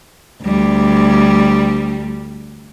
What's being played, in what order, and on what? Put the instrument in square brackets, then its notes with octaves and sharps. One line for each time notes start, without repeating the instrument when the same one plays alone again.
[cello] D2 G3